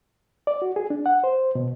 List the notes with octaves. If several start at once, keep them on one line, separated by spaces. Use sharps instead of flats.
D5
F#4
G#4
D4
F#5
C5
B2